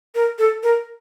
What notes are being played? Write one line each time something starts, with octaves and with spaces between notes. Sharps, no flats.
A#4
A4
A#4